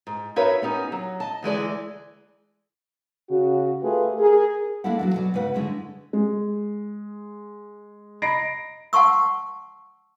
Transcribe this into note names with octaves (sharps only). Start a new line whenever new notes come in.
G#2
D#4 F#4 A#4 B4 C#5 E5
B3 C#4 D#4 G4
F#3
D#5 A5
D2 E3 G#3 D5
C#3 F#4
A3 F4 G4 G#4 B4
G#4 A#4
G#3 A#3 D4 E4 A4 F#5
E2 E3 F#3
B2 F#3 D5
G#2 C#3 B4 F#5
D3 G#3 C#4 E4
G#3
D#5 A#5 B5 A#6 C7 D7
F#5 A5 C6 C#6 E6